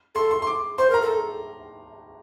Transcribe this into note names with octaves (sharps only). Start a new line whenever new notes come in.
A4 C6
C6
C6
D6
C5 C6
A#4 A#5
A4